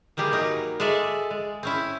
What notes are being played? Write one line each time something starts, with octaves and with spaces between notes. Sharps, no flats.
E3 G3 A#3 G4 G#4
F#3 D#4 A#4
G#3 F4 A4 D5 E5
G#3
C4 C#4 E4